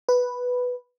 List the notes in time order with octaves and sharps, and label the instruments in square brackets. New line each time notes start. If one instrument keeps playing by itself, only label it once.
[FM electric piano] B4